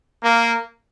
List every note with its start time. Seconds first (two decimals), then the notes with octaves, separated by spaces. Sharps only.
0.23 A#3